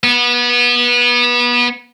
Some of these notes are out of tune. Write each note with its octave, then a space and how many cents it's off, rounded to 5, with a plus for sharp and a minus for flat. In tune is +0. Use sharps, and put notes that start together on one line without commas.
B3 -25